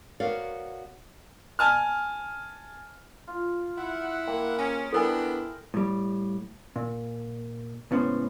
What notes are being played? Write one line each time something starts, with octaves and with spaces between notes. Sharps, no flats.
B3 F#4 A#4 C#5 D5 F5
G#5 A5 F6
F4
E4 F#5
A#3 G5
C#4 G#4 A#4
B3 D4 E4 A4 A#4 G5 G#5
A2 G3
A#2
C#2 A2 B3 C#4 C5